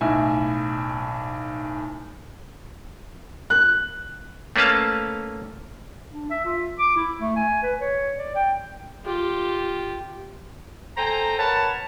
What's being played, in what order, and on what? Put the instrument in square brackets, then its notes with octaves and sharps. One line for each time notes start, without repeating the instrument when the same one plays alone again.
[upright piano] B1 A2 E5 G#5
F#6
[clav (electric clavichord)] A3 A#3 C#4 B4 F5 A5
[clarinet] D4
E5
F4
D6
E4
A3
G#5
B4
C#5
D5
G5
[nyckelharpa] F4 G4
[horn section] A4 C5 G5 G#5 A#5
A#4 B4 C#5 F#5 A5